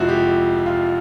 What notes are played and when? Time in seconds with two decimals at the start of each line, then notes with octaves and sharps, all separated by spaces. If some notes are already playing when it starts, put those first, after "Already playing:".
Already playing: F2 C3 F3 G#3 E4 F#4
0.08 G4
0.66 F4